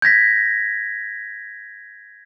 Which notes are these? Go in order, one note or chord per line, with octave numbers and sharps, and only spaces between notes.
G6 G#6 A#6 B6